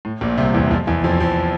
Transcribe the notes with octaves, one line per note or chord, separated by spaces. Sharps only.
A2
A#1 A#2
C2 C3
E2 E3
F2 F3
E2 E3
F2 F3
F2 F3